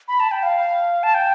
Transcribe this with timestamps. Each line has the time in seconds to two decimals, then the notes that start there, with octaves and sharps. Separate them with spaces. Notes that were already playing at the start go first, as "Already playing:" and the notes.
0.08 B5
0.20 A5
0.31 G5
0.43 F5
1.03 A5
1.14 G5